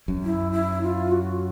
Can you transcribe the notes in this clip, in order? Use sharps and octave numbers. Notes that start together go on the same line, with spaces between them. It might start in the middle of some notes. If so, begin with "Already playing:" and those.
F#2
E4
E4
F4
F#4